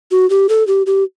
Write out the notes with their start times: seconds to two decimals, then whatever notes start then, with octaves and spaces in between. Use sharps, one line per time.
0.11 F#4
0.30 G4
0.49 A4
0.67 G4
0.86 G4